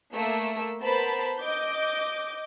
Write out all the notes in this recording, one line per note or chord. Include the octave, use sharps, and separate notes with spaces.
A3 A#3 E6
B3 A#4 C5 A5 B5
D#5 D6 G6